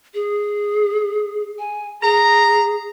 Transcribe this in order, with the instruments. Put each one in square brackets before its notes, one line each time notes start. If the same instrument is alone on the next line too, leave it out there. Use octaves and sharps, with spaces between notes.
[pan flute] G#4
G#5
[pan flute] G#4 [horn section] A#5